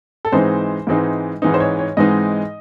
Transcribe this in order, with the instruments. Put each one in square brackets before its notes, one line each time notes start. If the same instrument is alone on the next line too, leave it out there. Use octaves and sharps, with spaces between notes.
[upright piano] A4
G#2 E3 G#3 C4 D#4 C5
G#2 E3 G#3 C4 D#4
G#2 E3 G#3 C4 D#4
C5
C#5
C#5
G#2 E3 G#3 C4 D#4 D#5